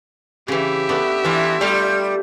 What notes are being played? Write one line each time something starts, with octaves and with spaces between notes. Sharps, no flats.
C#3 E3 G4 E5
A3 B3 D4
E3 D4 F4
G3 A3 F5 C6